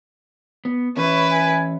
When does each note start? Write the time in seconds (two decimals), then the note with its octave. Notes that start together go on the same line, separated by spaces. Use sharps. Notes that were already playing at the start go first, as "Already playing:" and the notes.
0.65 B3
0.97 E3 C#4 E4 B4 C#5
1.31 G#5